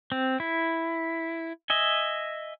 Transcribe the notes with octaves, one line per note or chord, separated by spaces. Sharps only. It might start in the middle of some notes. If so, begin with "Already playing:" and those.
C4
E4
D#5 E5 G#5